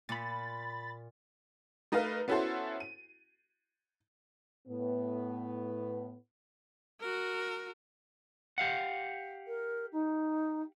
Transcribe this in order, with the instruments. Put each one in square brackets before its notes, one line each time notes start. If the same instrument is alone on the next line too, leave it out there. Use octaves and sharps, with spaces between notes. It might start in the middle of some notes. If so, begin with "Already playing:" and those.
[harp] A#2 [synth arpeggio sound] B5 A6
[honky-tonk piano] A3 D#4 A#4 B4 F5
B3 C#4 E4 F#4 A4 C5
D#7
[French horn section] A2 B3
[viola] F#4 A#4
[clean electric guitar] G4 F5 F#5
[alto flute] A#4
D#4